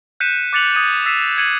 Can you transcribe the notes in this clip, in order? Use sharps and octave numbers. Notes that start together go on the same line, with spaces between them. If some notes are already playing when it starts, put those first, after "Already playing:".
F#6 G6 B6 C#7 D#7 E7
D6 F#6 A6 C#7 F7 F#7
D#6 G#6 A6 D#7
E6 A6 B6 C7 D#7 E7
G#6 C#7 D#7 F#7